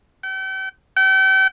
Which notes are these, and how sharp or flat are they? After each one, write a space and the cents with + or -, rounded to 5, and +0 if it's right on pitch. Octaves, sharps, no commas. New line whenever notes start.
G5 -40
G5 -40